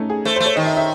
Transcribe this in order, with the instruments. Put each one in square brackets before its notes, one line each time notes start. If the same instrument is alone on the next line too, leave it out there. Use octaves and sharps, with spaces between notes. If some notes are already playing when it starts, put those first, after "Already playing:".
Already playing: [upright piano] A3 C#4 D#4
G#4
[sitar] A3 [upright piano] C5
[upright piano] C5
[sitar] A3
[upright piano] C#5
[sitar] D#3 [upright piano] D#5
[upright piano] E5
E5